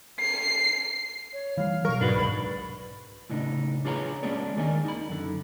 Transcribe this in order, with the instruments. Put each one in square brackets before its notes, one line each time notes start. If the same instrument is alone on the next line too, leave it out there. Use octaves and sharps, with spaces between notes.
[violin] C7
[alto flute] C#5
[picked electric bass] E3 G3 [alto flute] F5
[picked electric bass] B2 F#3 [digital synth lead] A#4 [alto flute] C#6
[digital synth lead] G#2 [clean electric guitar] D4 B4 [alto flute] F#4
[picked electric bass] F1 C2 [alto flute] B5
[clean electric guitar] A2 C#3 D4 D#4
D4 F4 G#4 B4 C#5 A#5
G#3 A#3 C#4 D4 G#4 D5
D#2 D#3 A#3 D4 D#4 G#5
D#4 B5
F#2 D3